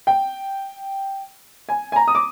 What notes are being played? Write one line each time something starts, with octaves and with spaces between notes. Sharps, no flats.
G5
G#5
G#5
A#5
D#6
D6